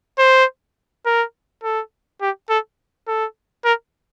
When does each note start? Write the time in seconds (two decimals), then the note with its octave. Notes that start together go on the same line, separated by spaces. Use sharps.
0.18 C5
1.06 A#4
1.63 A4
2.21 G4
2.49 A4
3.08 A4
3.64 A#4